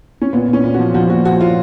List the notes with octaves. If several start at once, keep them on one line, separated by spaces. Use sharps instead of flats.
C#4
A#2 B3
A#2
C#4
A#2
F3 F#4
F3 F#4
A#2 F#4
F3 F#4
A#2 F4